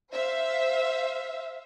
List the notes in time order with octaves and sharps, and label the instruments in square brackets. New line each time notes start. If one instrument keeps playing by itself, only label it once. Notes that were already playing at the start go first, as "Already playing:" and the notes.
[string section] C5 E5 F5